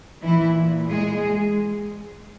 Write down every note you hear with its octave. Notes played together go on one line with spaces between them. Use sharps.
A#2 E3 E4
G#3 G#4